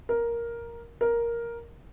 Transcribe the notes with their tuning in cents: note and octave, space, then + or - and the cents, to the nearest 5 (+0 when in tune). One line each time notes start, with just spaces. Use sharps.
A#4 +5
A#4 +5